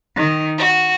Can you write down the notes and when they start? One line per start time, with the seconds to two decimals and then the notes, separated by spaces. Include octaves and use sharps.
0.15 D#3
0.59 F#4